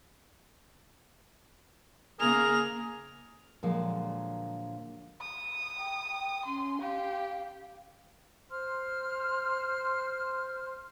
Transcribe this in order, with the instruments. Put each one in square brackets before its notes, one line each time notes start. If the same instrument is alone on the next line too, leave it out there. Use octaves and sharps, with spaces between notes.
[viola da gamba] C#3 A#3 [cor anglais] G#4 [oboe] A#4 [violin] F7
[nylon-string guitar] A#2 D3 F3 F#3 G#3
[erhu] D#6
[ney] G5
[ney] C#4 [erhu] C6
[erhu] G4 [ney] F5
[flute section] C5 C6 F6